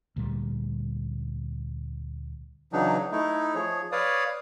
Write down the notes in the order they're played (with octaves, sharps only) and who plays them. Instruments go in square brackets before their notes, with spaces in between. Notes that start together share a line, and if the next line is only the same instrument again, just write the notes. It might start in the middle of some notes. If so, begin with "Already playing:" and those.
[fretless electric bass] D2 A#2 G3
[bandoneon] C#3 E3 F#3 D4 D#4
A3 D#4 E4
F3 G#4 C#5
B4 C#5 D5 F5 D#6